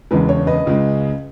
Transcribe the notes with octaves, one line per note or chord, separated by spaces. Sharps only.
E1 E2 C#3 G#3 B4
C#5
B4 D#5
C#2 C#3 G#3